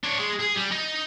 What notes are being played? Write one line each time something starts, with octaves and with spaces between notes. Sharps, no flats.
D4 C#5
G#3
G#4
G3
D#4